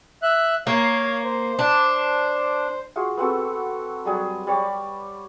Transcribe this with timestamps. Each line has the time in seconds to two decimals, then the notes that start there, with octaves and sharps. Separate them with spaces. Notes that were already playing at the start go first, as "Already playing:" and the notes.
0.22 E5 F#6
0.67 A#3 C#5 F5
1.24 C5
1.59 D4
2.96 F4 F#4 G#4
3.17 B3 C4 F#4 A4
4.05 F#3 G3 G#4
4.47 G3 C#5 D5